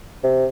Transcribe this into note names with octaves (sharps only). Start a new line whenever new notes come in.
C3